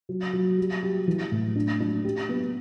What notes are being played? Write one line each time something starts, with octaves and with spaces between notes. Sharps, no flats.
F#3
F#3
G3
G4
E3
A2
D4
D4
G4
B3